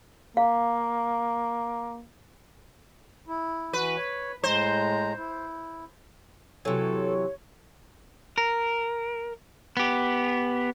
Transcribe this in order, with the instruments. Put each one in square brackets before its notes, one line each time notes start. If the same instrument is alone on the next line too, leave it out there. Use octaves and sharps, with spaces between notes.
[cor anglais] A#3 [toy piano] F5
[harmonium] E4
[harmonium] E3 F#4 [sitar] B4
[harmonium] C#5
[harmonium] A2 G#3 A#5 [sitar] C5
[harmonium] E4
[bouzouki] C3 E3 [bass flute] F#3 [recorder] A4 [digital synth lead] C#5
[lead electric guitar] A#4
B3 G4